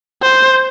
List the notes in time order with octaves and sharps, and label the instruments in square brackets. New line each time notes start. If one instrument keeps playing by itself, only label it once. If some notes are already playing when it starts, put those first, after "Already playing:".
[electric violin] C5